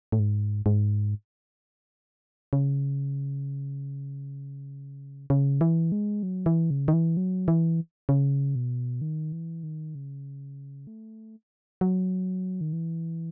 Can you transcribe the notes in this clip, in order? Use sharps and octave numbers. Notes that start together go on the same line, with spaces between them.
A2
G#2
G#2
C#3
C#3
E3
G#3
F#3
E3
C#3
D#3
E3
F#3
E3
C#3
B2
D#3
E3
D#3
C#3
A3
F#3
D#3
E3